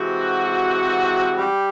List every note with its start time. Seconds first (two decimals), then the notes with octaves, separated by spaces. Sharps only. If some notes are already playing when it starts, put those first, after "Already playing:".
Already playing: C3 E3 G#3 C4 F#4
1.37 G3 G4